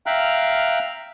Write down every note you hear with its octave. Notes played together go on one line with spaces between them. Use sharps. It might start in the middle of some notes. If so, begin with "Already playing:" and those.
E5 F5 G5 A#5 F6 F#6